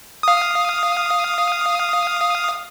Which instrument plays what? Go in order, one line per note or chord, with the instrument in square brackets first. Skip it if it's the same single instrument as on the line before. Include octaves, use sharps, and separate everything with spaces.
[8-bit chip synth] F5 D#6